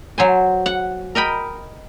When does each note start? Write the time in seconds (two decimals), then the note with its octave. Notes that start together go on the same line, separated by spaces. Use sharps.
0.18 F#3 C5 G#5
0.66 F#5
1.15 A#4 D#5 G5 B5